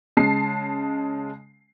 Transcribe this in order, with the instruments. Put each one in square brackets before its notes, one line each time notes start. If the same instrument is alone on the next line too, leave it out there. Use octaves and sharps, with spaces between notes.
[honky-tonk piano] C#3 G#3 A5 C7